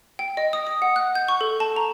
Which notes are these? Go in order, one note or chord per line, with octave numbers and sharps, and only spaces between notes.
G5
D#5
D#6
D#6
F#5
F#6
G6
C#6
A4
A5
A#5